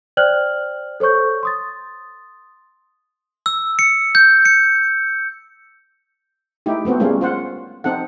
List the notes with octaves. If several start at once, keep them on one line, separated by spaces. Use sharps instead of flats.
C5 D5 G5 F6 F#6 F#7
A4 C5 C#5 C#6 G6
C6 D#6 A6
E6
C#7
G6
C#7
A3 D#4 E4 G4
A3 B3 C4 F#4
G3 G#3 A#3 C#4 F4
F4 C5 F#5
C4 D#4 A4 F#5